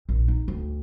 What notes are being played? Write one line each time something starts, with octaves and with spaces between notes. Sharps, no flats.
A#1
D#4
D2